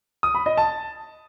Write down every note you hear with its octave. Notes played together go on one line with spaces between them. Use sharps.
D#6
B5
D#5
A5